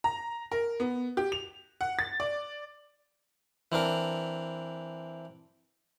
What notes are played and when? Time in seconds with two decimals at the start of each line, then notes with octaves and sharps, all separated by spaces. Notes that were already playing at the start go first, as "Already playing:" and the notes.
0.04 A#5
0.52 A#4
0.80 B3
1.17 G4
1.32 F7
1.81 F#5
1.99 A6
2.20 D5
3.72 E3 C4 D4 A#4